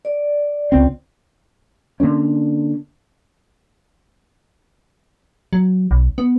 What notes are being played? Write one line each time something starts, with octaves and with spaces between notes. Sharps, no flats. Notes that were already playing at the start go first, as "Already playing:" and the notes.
D5
C#2 C4
D3 E3 A#3 C#4
F#3
B1
B3